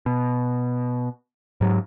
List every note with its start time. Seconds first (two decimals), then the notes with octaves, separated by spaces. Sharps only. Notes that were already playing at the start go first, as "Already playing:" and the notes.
0.06 B2
1.61 G#2 F#3